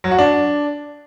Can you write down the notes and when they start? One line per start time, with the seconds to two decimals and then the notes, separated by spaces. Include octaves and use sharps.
0.04 F#3
0.11 F#4
0.19 D4